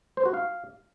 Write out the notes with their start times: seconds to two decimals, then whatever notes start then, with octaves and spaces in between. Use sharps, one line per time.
0.17 C5
0.26 F#4
0.34 F5